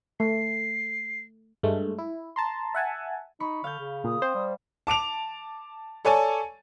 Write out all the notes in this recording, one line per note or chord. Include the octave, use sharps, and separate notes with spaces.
A3 C7
G2 G#3 A3
E4
A5 A#5 C6
E5 F#5 G#5 A5
D#4 B5 C#6
D3 F5 F6 G6
C#3
A#2 D#6
C4 C5
G3
A5 D6 D7 F7
A4 C#5 D5 G#5 A5